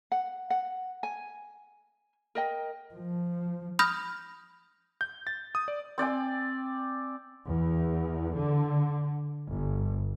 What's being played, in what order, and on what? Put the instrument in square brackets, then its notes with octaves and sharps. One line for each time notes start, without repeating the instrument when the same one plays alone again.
[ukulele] F#5
F#5
G#5
A#4 D#5 G5
[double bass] F3
[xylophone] B5 D#6 F6 G6 A#6
[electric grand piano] G6
A6
D#6
D5
[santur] C4 D5 G5 G#5
[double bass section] E2
D3
G1